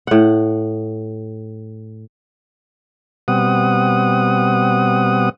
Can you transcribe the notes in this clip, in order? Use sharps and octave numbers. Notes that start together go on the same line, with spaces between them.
A2 F#5
B2 G3 C4 F#5 D#6